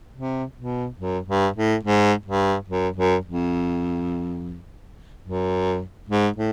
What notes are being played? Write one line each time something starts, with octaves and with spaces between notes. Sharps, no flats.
C3
B2
F#2
G2
A2
G#2
G2
F#2
F#2
F2
F#2
G#2
A2